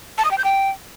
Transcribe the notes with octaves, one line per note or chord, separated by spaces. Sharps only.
A5
D#6
G5
G6
G5